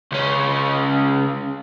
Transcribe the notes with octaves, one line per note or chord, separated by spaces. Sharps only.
C#2 C#4